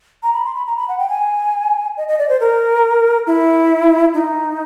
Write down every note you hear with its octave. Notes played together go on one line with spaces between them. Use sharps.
A#5
B5
C6
B5
A#5
B5
F#5
G5
G#5
D#5
D#5
D5
C5
A#4
E4
D#4